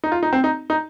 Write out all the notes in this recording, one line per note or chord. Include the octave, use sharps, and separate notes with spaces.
D#4
F4
D#4
C4
D#4
D#4